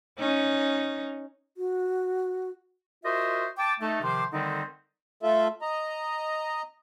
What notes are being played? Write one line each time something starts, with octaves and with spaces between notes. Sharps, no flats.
C#4 D#4
F#4
F4 F#4 A#4 C5 D#5 E5
G5 A5 D6
A3 D#4 A4
C3 D#3 F3 C5 C6 D6
D3 D#3 G3 A3 C4 D#4
A3 F4 A4 E5
D#5 A#5